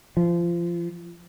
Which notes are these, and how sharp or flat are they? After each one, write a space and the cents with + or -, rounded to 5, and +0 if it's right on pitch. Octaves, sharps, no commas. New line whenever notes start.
F3 -25